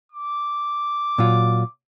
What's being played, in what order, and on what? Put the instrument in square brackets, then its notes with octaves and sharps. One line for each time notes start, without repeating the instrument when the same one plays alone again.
[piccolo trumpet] D6
[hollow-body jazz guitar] A#2 F#3 F4